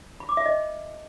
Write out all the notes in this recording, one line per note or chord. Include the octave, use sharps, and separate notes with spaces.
B5
D6
E5
D#5